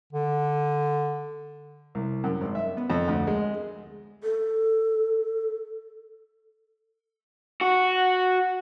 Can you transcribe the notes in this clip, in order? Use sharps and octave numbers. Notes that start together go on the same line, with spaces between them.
D3
C2
F#2
G#1
E5
B3
F2
D2
G#3
A4
F#4